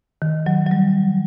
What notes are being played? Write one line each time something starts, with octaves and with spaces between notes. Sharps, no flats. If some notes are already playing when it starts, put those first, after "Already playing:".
D#3
F#3
F#3
G3